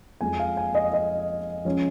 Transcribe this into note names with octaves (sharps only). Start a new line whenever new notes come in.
F2 F3 G#3 G#5
F5
G#5
D#5
D#5
F3 G#3 C#4